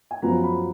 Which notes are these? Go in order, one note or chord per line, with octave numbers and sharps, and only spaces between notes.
G#5
F#2 F3 B3 F4 A#5
B5